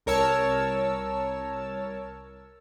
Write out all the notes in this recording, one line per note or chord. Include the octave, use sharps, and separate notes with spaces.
C2 A#4 C#5 A5 E6